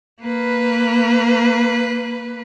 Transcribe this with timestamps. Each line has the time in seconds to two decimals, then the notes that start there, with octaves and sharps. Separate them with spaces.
0.22 A#3 B4